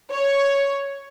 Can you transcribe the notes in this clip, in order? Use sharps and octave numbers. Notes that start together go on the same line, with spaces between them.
C#5